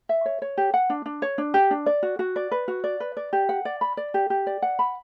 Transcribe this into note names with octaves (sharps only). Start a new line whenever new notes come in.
E5
C#5
C#5
G4
F#5
D4
D4
C#5
D4
G4
D4
D5
F#4
F#4
D5
B4
F#4
D5
B4
D5
G4
F#5
D5
B5
D5
G4
G4
D5
F#5
B5